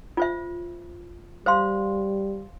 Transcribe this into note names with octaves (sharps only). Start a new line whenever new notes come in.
F4 C5 E5
G3 C5 F5 C6